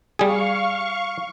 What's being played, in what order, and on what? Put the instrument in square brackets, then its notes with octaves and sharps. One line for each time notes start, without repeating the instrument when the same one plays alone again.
[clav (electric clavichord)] G3 G#4 [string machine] F5 C#6